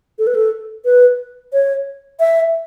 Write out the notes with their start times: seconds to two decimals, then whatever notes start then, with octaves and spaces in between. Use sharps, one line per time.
0.19 A4
0.27 B4
0.35 A4
0.85 B4
1.53 C#5
2.20 E5